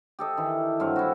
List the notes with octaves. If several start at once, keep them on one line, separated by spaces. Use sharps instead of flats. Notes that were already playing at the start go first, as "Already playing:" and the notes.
G4 A4 D#5
D#3 E3
G2 F#3 C4 F5
E4 F#4